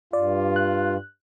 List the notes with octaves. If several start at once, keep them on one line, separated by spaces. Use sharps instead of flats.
G2 F4 D5
F#6